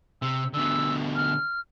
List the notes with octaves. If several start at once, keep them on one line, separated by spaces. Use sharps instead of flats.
C3 E6
B2 D3 E6
F6